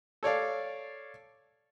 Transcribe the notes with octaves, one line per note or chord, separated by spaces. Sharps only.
A4 C#5 D5 F5